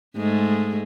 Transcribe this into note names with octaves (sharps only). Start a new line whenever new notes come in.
G#2 G#3 A3